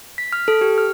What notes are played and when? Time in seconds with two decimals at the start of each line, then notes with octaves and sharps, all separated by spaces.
0.18 B6
0.33 F6
0.48 A4
0.61 G4
0.78 F6